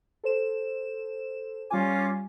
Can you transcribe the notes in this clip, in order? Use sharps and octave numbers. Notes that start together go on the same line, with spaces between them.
A4 C5 E7
G3 C#4 F4 G#5 D6